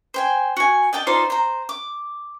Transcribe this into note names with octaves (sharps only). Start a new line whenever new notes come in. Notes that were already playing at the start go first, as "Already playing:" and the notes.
C5 G5 G#5
F#4 G#5
D5 D#5 G5 A5
D#4 F4 C5 D5
C5 A#5
D6